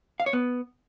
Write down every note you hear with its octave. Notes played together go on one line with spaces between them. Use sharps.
F5
C#5
B3